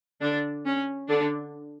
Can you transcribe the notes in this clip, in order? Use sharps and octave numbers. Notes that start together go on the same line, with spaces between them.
D3 D4
C#4
D3 D4